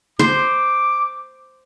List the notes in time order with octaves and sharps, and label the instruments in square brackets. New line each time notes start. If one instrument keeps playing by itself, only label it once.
[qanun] C5 [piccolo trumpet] D6